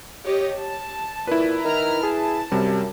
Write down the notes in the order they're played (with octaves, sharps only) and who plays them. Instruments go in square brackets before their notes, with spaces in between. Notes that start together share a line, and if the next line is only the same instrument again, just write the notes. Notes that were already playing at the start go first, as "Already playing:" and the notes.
[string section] G4 C#5 D#5
A5
[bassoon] A#2 [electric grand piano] E4 B4
[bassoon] D#3 [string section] A#5 F6
[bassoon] G#4 [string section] A5
[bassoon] F#2 [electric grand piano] C3 G3